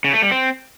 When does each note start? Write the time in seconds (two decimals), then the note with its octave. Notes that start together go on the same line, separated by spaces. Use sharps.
0.04 C#3
0.13 A3
0.22 G3
0.31 C4